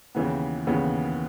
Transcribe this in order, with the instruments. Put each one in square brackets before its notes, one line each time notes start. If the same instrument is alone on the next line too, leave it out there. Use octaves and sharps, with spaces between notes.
[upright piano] D#2 C#3 E3 B3
D#2 C#3 E3 B3